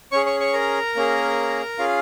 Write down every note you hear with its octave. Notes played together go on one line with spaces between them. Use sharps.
C#4 G#4 C#5 C#6
C#5 C#6
C#5 C#6
A#4 A#5
A#3 C#4 G#4
C#4 F4 G#4 F5